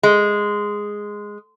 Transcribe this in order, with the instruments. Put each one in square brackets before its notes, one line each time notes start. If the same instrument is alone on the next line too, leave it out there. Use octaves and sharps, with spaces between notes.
[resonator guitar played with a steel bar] G#3